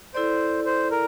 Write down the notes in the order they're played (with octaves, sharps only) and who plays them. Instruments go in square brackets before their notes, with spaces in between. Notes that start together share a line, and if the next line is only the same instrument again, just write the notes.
[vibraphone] E4 A4 D5 [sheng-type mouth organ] C5
[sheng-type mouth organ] C5
A#4